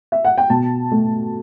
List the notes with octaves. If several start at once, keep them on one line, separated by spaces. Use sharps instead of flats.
E5
F#5
G5
B2 A5
A3